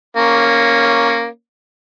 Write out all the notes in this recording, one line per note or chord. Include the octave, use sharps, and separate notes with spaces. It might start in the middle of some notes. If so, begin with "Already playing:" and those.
A#3 C#4